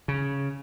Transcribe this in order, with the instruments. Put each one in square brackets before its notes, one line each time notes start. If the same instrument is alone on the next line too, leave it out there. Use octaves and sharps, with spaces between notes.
[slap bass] C#3